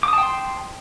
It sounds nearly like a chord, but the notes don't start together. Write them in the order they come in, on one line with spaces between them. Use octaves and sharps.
D6 D#6 A5 G5 C6